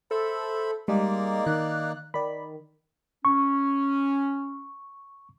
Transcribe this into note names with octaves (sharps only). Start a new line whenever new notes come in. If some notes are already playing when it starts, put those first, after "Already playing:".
A4 C5 E5 B5
G3 G#3 A#3 D#4 D5
D#3 F#6
D#3 D5 B5
C#4 C#6